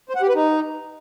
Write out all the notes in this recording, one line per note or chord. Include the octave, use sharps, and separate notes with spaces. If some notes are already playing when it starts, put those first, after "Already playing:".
C5
F#5
G4
B4
D#4